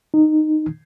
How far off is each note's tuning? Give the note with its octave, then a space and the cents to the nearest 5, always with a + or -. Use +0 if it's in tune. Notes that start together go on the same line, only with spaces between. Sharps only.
D#4 -15